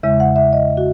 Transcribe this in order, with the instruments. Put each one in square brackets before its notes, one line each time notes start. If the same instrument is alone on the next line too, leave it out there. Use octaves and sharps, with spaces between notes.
[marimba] E2 C#3 G#3 E5
F#5
E5
D#5
F#4